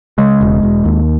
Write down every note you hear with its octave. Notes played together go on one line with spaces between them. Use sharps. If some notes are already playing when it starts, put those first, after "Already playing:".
C#3 G#3
E1
E1
D#2